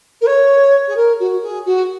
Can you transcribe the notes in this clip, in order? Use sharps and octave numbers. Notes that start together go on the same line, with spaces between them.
A#4
C#5
G#4
A#4
F#4
G#4
F#4